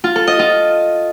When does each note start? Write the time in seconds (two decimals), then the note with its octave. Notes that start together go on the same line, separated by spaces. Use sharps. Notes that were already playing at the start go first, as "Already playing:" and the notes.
0.04 F4
0.16 A4
0.27 D#5
0.39 F4